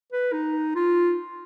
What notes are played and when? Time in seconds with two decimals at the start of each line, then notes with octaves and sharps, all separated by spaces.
0.12 B4
0.33 D#4
0.75 F4